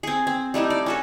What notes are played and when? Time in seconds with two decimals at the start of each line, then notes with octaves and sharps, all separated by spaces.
0.03 C4 G#4
0.27 C4
0.54 G3 A3 D#4 E4
0.70 D5
0.86 C#4 F#4 A4